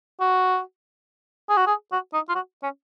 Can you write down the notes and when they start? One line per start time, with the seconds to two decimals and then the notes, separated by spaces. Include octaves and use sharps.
0.20 F#4
1.49 G#4
1.57 F#4
1.66 G#4
1.92 F#4
2.13 D#4
2.29 F4
2.35 F#4
2.63 C#4